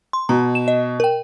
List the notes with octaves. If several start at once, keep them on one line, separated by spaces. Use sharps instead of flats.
C6
B2 A#5
E7
D#5
A#4 G5